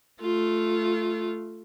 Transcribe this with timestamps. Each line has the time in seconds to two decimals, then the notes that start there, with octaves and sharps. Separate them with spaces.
0.21 A3 F4